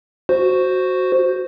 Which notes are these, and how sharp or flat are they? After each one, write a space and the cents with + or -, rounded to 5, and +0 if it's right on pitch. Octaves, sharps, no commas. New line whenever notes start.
F#4 +0 C5 +0